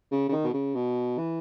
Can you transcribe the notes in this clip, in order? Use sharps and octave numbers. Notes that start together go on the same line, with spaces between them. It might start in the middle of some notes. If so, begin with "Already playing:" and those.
C#3
C#3
D#3
B2
C#3
B2
E3